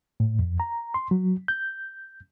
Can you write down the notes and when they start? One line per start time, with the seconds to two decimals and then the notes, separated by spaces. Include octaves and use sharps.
0.20 A2
0.39 F2
0.60 A#5
0.94 C6
1.11 F#3
1.48 G6